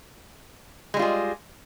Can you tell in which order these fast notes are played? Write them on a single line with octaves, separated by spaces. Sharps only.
G#3 G3 F4 G#4